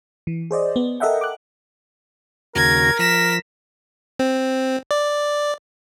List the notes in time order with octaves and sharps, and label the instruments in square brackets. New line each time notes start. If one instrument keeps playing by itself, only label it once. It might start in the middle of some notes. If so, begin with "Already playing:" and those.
[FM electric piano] E3
G#4 C5 D5 D#5
B3
A4 A#4 D#5 E5 F#5 G5
D6 F#6
[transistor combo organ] D#2 C#3 F#4 [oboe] A#4 [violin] G#6 [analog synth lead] A#6
[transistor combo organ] F3 [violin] B6 E7
[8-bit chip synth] C4
D5